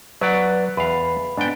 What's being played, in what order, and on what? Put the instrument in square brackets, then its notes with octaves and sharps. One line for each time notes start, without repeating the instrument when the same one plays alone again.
[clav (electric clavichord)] F#3 [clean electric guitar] B4 D5 F#5
[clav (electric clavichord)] E2 F5 [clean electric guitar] B4
[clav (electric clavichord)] G#2 G5 [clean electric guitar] B3 D4